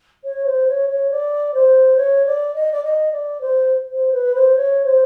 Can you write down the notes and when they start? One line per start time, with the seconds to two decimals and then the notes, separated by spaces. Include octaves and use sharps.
0.24 C#5
0.46 C5
0.68 C#5
0.89 C#5
1.11 D5
1.54 C5
1.97 C#5
2.26 D5
2.55 D#5
2.72 D5
2.84 D#5
3.13 D5
3.41 C5
3.92 C5
4.13 B4
4.35 C5
4.56 C#5
4.85 C5